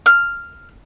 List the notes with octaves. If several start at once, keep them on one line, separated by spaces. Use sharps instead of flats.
F6